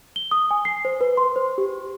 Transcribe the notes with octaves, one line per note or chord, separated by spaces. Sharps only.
G7
D#6
G#5
C7
C5
B4
C6
C5
G4